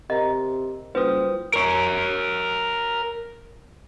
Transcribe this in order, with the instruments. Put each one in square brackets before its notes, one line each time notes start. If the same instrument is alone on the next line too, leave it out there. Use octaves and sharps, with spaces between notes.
[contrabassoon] C3 [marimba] A#4 A#5 [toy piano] D#5
[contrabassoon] F#1 [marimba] F#3 G3 F4 [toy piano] B4 [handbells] C5 D#6
[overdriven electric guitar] A#4 C#5